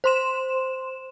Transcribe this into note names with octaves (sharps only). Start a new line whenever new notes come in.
C5 C6 E7